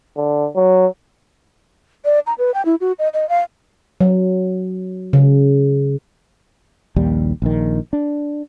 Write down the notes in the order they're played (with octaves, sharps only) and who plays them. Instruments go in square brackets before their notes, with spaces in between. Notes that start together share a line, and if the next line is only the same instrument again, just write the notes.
[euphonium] D3
F#3
[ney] D5
A#5
B4
G5
E4
F#4
D#5
D#5
F5
[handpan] F#3
C#3
[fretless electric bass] A#1 D#2 G3
A#1 D#3
D4